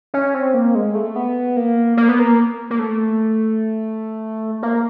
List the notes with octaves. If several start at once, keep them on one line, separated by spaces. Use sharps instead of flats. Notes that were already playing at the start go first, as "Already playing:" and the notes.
C#4
C4
A#3
G#3
A3
B3
A#3
A#3
B3
A#3
A#3
A3
A#3